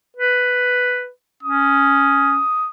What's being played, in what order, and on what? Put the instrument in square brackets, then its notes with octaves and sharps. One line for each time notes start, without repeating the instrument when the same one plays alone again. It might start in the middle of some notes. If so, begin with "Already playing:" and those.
[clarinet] B4
[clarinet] C#4 [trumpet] D#6